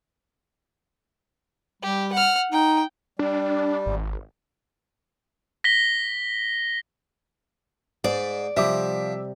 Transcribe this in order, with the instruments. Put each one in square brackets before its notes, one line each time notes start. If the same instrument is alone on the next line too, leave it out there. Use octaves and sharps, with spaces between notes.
[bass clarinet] G3 [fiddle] G4
[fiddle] F#5 F6
[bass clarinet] D#4 [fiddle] G5
[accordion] G3 [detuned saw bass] D4
[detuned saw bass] G#1
[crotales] A#6 B6 G7
[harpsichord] G#2 [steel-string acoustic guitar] D5
[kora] C3 G3 [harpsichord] F3 [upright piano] E5 D6